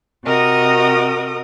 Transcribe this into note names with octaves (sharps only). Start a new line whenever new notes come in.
C3 F#4 A#4 D#5 D#6